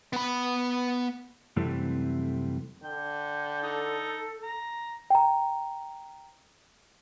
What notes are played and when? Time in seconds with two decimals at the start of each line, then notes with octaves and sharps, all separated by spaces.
0.13 B3 B5
1.56 F#2 C3 E3 G3 A3 C4
2.84 D3 G5
3.63 D#4 A4
4.43 A#5
5.10 G5 A#5